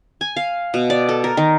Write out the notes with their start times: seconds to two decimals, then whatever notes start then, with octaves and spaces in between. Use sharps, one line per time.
0.21 G#5
0.36 F5
0.74 B2
0.90 D5
1.09 A4
1.24 A#4
1.37 D#3